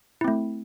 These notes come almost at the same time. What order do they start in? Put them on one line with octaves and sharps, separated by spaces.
E4 C4 A3